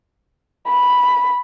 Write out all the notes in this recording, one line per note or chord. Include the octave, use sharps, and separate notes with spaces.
B5